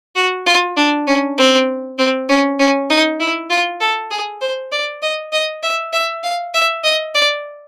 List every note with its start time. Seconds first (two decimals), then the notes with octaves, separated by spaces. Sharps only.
0.15 F#4
0.46 F4
0.77 D4
1.07 C#4
1.38 C4
1.98 C4
2.29 C#4
2.59 C#4
2.90 D#4
3.20 E4
3.50 F4
3.80 A4
4.11 G#4
4.41 C5
4.72 D5
5.02 D#5
5.32 D#5
5.63 E5
5.93 E5
6.23 F5
6.54 E5
6.84 D#5
7.14 D5